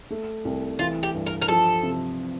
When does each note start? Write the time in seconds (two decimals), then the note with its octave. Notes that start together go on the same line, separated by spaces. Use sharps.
0.11 A3
0.45 C2
0.79 E3 F4
1.03 G4
1.14 G2
1.26 A#4
1.42 A#4
1.48 F3 A4
1.83 C3